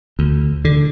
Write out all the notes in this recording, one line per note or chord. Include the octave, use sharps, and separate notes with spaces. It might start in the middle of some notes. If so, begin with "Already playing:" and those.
D2
D3